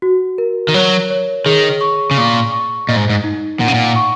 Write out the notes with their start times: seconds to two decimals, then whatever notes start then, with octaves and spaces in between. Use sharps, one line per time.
0.02 F#4
0.38 A#4
0.68 D#3
0.74 F#3 C#5
1.10 C#5
1.46 D#3 G#4
1.81 C#6
2.11 C#3
2.17 A#2 C#6
2.52 C#6
2.88 A#2 D#5
2.96 G#2
3.10 G#2
3.24 D#4
3.60 A#2 F#5
3.68 C#3
3.74 A#2
3.96 C#6